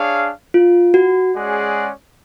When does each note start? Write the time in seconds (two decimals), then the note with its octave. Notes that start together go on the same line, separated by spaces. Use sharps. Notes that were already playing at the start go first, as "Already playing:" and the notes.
Already playing: D4 G#4 C#5 F5
0.54 F4
0.94 F#4
1.34 G#3 C#4 G#4 D5 F#5